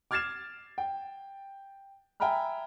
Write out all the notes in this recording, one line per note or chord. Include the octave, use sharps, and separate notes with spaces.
D6 F6 G#6 A6 C7 E7
G5
E5 G5 G#5 A#5 B5 F6